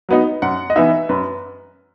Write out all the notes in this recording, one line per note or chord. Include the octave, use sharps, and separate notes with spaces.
F#3 B3 D#4
F#2 F#5
D#5
E3 B3 D#4 E5
F#2 B4